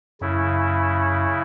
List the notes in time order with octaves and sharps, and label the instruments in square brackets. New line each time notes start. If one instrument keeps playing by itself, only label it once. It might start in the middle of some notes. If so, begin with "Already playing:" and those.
[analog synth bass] F#2 [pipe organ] C#3 E4